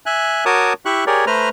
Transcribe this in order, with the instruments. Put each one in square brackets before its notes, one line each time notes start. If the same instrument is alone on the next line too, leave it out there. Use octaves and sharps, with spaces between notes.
[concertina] E5 G#5 F#6
F#4 A#4 C#5 A5 D6 D#6
E4 G4 E5 C#6 F#6
G4 G#4 A#4 C#5 D5
A3 B4 C5 A#5 F6